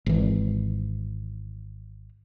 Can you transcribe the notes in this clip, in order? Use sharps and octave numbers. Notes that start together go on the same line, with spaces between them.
G#1 E3